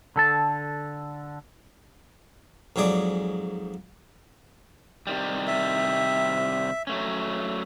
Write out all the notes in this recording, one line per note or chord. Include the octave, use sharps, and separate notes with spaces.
D3 A4 A5
F2 G#2 F#3 G#4 D5
C3 D#3 G3
E5
F#3 A3 C#4